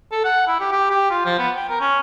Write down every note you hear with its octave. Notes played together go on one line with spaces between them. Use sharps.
A4
F#5
E4
G4
G4
G4
F4
F3
B3
G5
A#4
C#4